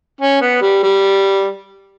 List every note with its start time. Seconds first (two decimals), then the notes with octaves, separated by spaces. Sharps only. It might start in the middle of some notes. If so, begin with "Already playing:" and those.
0.21 C#4
0.42 B3
0.62 G3
0.83 G3